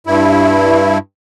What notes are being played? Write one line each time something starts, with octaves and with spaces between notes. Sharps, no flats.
G2 E4